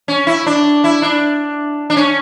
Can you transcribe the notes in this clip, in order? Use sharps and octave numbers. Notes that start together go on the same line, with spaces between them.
C#4
E4
D4
E4
D4
D4
C#4